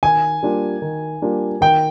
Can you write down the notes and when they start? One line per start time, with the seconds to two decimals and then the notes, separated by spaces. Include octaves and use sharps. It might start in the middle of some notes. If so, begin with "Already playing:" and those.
0.03 D#3 G#5
0.43 G3 A#3 D4 F4
0.82 D#3
1.22 G3 A#3 D4 F4
1.61 D#3 G5